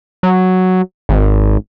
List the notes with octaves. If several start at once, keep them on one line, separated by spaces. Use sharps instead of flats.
F#3
G#1